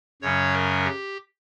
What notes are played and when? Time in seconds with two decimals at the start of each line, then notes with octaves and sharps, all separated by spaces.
0.22 F#2 C#3 F#3 C#4 C#5
0.53 A#4
0.84 G4